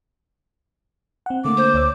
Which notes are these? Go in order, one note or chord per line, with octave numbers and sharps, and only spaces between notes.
C4 F#5
D3 A3 A#3 D6
C5
D2 C#5 E6